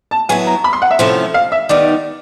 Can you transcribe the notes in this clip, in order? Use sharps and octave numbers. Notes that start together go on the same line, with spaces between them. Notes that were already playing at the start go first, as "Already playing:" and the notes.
A5
F#3 B3 E4 G#5
A#5
B5
C6
F#5
E5
C3 F3 A3 C#4 E4
F5
E5
D#3 G3 B3 D#4 D5